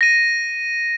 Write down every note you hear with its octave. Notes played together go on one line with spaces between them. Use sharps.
A#6 D#7